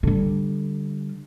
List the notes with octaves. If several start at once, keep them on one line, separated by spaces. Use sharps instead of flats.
D3 G3